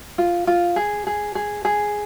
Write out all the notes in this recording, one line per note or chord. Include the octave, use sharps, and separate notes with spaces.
F4
F4
G#4
G#4
G#4
G#4